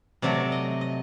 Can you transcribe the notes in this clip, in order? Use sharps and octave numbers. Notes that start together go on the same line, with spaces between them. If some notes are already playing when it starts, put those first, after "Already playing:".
C3 F#3 A3 D5
D#5
D#5